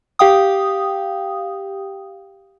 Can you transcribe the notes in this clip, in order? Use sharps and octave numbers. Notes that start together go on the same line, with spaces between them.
G4 F5 G5 D#6